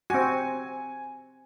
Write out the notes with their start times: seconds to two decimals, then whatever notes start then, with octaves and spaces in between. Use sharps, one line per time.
0.10 C4 F#4 G#5